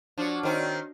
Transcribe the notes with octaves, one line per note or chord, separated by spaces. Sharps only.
F3 D4 F#4 C#5
D#3 C4